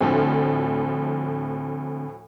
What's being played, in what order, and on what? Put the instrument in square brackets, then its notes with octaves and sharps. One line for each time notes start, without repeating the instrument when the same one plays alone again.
[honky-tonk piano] D2 A2 F3 [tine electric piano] D3 C4